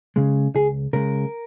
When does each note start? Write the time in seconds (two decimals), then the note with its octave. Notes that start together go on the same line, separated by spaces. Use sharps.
0.16 C#3 G#3
0.55 C#2 G#4
0.93 C#3 G#3 A#4